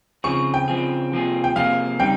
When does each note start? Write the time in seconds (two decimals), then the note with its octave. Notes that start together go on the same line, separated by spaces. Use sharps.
0.24 C#3 F3 C4 F4 G#4 C#6
0.54 G5
0.68 C#3 F3 C4 F4 G#4
1.12 C3 F3 A#3 F4 G#4
1.44 G5
1.56 C3 F3 A#3 F4 G#4 F5
1.99 C#3 G3 C4 D#4 G5